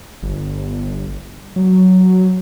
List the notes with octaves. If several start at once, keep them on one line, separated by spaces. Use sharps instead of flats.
G1
F#3